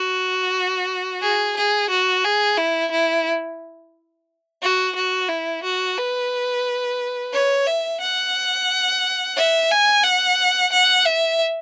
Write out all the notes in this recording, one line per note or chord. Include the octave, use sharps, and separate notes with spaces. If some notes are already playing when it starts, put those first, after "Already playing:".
Already playing: F#4
G#4
G#4
F#4
G#4
E4
E4
F#4
F#4
E4
F#4
B4
C#5
E5
F#5
E5
G#5
F#5
F#5
E5